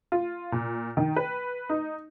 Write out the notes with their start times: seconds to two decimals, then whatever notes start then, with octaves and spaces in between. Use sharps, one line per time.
0.12 F4
0.52 A#2
0.97 D#3
1.16 B4
1.69 D#4